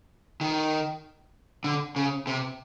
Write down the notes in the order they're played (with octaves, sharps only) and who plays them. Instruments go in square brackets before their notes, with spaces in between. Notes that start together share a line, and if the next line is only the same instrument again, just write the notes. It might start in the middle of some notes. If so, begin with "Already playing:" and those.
[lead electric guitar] D#3
D3
C#3
C3